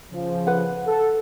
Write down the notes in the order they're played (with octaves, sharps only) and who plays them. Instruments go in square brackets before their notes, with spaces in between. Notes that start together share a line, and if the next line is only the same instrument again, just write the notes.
[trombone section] C#3 F3
[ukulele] B4 F#5
[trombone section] A4